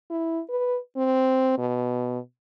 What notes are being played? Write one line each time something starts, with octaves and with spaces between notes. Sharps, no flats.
E4
B4
C4
B2